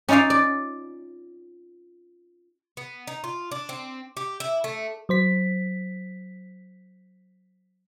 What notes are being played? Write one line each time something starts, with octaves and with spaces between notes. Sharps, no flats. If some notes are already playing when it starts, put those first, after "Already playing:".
C#4 D#4 F4 D5 F5
D5
B3
D#4
F4
D4
C4
G4
E4
A3
F#3 C5 B6